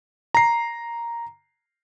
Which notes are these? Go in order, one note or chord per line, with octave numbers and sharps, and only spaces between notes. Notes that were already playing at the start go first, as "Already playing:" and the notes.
A#5 C7